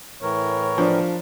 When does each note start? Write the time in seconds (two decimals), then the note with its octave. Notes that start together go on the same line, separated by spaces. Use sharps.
0.22 A2 E3 A#4 C#5
0.78 F3 D4